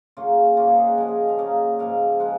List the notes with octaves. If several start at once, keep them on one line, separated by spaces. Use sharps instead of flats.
C#3 F#3 A#3 F4
G#2 F#3 A#3 F4
G#4
D#5
F#5
A#2 F3 G#3 F5
D#5
F5
C#3 F#3 A#3 D#5
G#2 F3 A#3 F5
F3 G#3 F#5